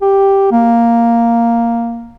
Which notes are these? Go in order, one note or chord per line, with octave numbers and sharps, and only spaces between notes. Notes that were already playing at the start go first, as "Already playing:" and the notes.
G4
A#3